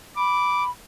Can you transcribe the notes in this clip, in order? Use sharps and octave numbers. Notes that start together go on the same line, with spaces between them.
B5 D6